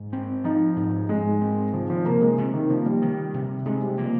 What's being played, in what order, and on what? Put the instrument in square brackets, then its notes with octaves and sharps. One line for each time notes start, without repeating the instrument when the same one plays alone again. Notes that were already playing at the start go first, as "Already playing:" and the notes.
Already playing: [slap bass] G#2
C4
[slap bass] F3 [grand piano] D#4
[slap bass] G#2
[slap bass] G#2 [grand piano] G#3
[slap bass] C4
[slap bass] D#3 [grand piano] F3
[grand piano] F3
[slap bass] C3 [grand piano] A#3
[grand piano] G#3
[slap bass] C3
[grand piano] D#3
[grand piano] F3 [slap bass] A#3
[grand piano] G3
[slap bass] D#3
C3
[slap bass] C3 [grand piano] G#3
[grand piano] G3
[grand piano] F3 [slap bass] A#3